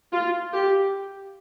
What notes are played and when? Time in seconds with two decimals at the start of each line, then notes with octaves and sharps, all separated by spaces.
0.13 F4
0.53 G4